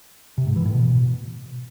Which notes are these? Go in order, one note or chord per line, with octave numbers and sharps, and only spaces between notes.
C3
G#2
E3
A2
B2